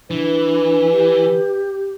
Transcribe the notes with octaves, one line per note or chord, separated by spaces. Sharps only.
E3 D4 B4
G4